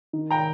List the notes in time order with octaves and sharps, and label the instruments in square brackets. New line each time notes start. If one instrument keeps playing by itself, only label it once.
[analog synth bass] D#3
[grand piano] G5 A#5